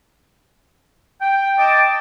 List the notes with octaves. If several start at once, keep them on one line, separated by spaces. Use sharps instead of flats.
G5
D#5 G5 A5 D6